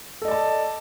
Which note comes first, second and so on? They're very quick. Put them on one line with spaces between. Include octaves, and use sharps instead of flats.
A4 D#5 D5 A5